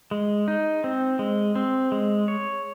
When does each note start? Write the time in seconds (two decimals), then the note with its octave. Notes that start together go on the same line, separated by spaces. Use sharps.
0.11 G#3
0.48 D#4
0.84 C4
1.19 G#3
1.56 C4
1.92 G#3
2.28 C#5